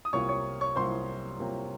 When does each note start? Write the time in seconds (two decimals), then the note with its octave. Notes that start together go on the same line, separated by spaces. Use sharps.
0.05 D#6
0.13 C2 C3 F#3 A#3 F4 C#5 C#6
0.29 C#5 C#6
0.61 C#5 C#6
0.76 C2 C3 F#3 A#3 F4 C5 C6
1.40 C2 C3 F#3 A#3 F4